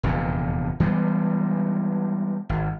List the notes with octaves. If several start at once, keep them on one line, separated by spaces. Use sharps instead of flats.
F1 E2 A#2 D3
E3 G3 G#3 B3
G#1